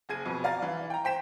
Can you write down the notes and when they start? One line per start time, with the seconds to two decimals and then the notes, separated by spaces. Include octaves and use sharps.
0.09 F#1 G#4 G#6 D#7
0.26 F2 B2
0.44 D5 F5 A#5 A6
0.62 E3
0.90 G5 A#5
1.04 C5 G5 B6 E7